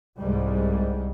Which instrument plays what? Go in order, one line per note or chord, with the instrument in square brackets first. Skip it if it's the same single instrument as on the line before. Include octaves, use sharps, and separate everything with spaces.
[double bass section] C2 G#2 G3